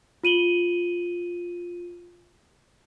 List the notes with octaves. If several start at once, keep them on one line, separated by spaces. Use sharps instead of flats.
F4 D#7 F#7 G7